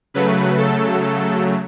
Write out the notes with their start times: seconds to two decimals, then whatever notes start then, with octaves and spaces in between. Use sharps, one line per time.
0.14 C#3 F#3 A3 B4
0.57 A4
1.01 A4